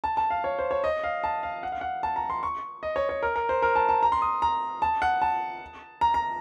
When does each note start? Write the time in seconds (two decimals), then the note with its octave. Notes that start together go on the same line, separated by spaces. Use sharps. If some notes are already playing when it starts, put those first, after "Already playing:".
0.04 A5
0.17 A5
0.30 F5
0.44 C#5
0.59 C5
0.71 C#5
0.84 D#5
1.04 F5
1.24 A5
1.43 F5
1.63 F#5
1.72 F5
1.81 F#5
2.03 A5
2.16 A#5
2.30 C6
2.43 C#6
2.83 D#5
2.96 C#5
3.09 C#5
3.22 A#4
3.36 A#4
3.49 C5
3.62 A#4
3.76 A5
3.89 A5
4.03 A#5
4.12 C6
4.22 D#6
4.42 A#5
4.82 A5
5.02 F#5
5.22 A5
6.01 A#5
6.14 A#5